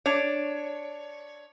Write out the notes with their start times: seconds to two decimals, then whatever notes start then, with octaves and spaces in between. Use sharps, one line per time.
0.06 D4 C#5